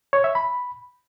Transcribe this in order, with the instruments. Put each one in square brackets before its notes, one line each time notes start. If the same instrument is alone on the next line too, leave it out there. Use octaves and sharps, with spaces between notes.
[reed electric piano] C#5
E5
B5